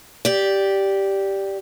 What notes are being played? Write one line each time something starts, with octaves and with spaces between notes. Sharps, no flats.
G4 D5